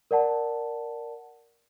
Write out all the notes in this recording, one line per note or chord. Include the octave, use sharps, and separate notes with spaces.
A#4 D5 F#5 A5